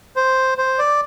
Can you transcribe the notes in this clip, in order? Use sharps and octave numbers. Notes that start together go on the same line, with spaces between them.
C5
C5
D5